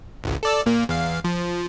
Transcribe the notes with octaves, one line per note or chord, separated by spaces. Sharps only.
G#1 C#2
A4 D5 E6
A#2 A#3
E2 F5
F3